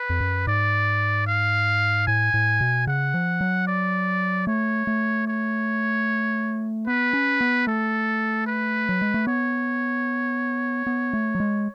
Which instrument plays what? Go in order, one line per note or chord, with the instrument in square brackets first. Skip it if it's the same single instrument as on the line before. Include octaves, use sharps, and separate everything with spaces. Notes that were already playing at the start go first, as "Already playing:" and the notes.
Already playing: [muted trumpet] B4
[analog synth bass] F2
F#2
[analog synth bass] G#2 [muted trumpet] D5
[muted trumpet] F5
[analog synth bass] A2 [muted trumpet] G#5
[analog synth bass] A2
B2
[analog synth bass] C#3 [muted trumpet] F#5
[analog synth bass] F3
F#3
[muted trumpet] D5
[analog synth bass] A3 [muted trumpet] C#5
[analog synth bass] A3
[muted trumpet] C#5
[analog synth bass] B3 [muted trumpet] B4
[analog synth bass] C#4
B3
[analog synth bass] A3 [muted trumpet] A4
[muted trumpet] B4
[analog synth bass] F#3
G#3
A3
[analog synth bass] B3 [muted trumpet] C#5
[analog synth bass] B3
A3
F#3
G#3